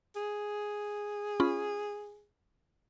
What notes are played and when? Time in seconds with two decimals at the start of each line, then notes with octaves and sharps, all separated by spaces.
0.16 G#4
1.40 C#4 F4 B5